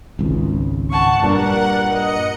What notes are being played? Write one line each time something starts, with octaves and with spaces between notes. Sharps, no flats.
G#1 C#2
F#5 A5 C#6
G2 A#2 G3 A#4 F#5
D#5 C#7